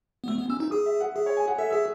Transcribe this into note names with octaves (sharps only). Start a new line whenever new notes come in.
B3
A3 E6
B3
C#4 E6
D#4
G#4 D#6
E5
F#5
G#4 E5
C#5
G#5
F#5
A4 E5
G#4 E5